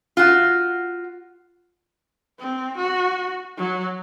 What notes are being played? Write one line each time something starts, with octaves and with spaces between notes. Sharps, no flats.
F4 F#4
C4
F#4
F#3